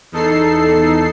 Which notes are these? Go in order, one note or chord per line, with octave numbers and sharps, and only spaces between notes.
E2 D#4 A4 C7